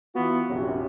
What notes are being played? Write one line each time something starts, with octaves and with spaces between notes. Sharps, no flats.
E3 B3 F4 F#4
A#1 F#2 C3 F#3